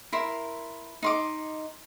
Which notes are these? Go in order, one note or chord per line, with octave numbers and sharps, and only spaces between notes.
E4 A#4 C6
D#4 C6 D6